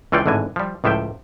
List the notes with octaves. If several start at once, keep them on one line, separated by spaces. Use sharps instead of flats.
C#2 E3 F4 C#5 D5 G5
G#1 A2 D3 E3 G#5
F3 G3
C#2 A2 F3 E5 G5